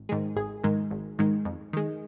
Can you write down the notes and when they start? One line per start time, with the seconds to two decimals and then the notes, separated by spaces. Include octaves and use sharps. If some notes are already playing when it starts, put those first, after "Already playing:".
Already playing: G#1
0.09 G#2 D#3 G#3
0.36 G#1 G#4
0.64 G#2 D#3 G#3
0.91 G#1
1.19 G#2 D#3 G#3
1.45 F2
1.73 D#3 G#3